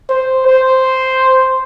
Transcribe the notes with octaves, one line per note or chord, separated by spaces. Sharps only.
C5
C5